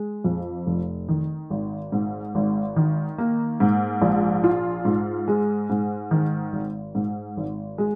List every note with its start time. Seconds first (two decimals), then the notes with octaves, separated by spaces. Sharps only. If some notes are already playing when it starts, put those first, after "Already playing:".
Already playing: G#3
0.24 F2
0.66 F1
1.08 D#3
1.50 G#1
1.92 G#2
2.35 G#1
2.76 D#3
3.18 A#3
3.60 G#2
4.02 A#1
4.44 F4
4.85 G#2
5.28 G#3
5.70 G#2
6.11 D#3
6.53 G#1
6.95 G#2
7.37 G#1
7.78 G#3